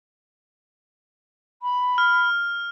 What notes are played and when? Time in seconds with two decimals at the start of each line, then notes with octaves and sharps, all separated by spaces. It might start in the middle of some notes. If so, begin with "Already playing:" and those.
1.62 B5
1.98 F6